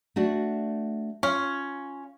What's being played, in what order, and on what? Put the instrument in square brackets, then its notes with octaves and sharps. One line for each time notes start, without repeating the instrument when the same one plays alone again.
[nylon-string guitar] A3 D4 F#4
[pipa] C#4 [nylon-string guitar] F4